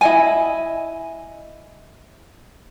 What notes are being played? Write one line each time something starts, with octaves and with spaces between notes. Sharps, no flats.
E4 D#5 G#5